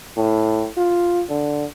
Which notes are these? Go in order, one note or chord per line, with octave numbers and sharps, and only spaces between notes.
A2
F4
D3